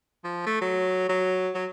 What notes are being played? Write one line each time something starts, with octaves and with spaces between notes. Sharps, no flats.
F3
A3
F#3
F#3
F#3